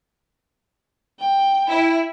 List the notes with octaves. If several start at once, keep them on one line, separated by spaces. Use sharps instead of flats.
G5
E4